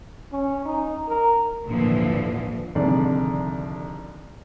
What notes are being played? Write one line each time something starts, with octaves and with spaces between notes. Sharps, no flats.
C#4
D#4
A#4
G#1 D#2 A#2 D3 E3 F3
C2 F2 D3 D#3 G#4 D5